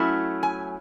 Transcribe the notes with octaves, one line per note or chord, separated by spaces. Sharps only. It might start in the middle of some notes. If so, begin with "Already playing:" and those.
Already playing: F#3 A3 C#4 E4
G#5